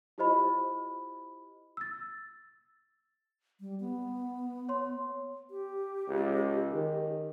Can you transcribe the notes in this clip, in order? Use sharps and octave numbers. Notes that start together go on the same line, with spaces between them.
E4 F4 G4 C5 D#5 B5
E6 A6
G3
B3
C#5 C6
G4
C#2
D#3